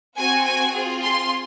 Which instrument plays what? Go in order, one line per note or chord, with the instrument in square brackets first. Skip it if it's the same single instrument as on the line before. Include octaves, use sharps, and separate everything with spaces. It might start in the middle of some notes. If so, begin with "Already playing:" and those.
[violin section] C4 F#4 G#5
G#5
C4 F4 G#4
C6